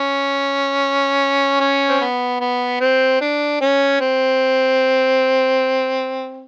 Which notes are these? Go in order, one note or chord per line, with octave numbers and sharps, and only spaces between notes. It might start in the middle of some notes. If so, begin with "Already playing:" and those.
Already playing: C#4
C#4
C4
B3
B3
C4
D4
C#4
C4